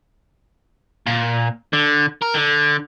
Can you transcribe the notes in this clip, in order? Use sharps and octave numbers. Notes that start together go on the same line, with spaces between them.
A#2
D3
A#4
D3